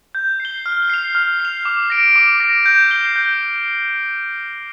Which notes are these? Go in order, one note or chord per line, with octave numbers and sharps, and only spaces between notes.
G6
C7
G7
F6
C7 F7
F6
C7 F7
D6
A#6 D7
D6
A#6 D7
G6
C7 G7
G6